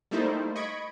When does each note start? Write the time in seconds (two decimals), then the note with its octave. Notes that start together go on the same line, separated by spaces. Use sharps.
0.11 G3 A3 A#3 D#4 E4 C5
0.56 D#5 B5 C#6 G#6 D7